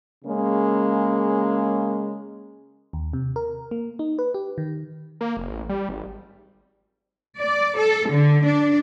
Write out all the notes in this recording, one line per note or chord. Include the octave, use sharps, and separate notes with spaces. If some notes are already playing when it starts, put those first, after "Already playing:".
C#3 G#3 A#3 C#4
D#2
C3
A#4
A#3
D#4
B4
G4
D#3
A#3
F1
A1
G3
G#1
D5
A4
D3
D4